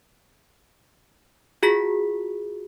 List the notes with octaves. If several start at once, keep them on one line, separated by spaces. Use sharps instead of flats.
F4 F#4 G#4 B6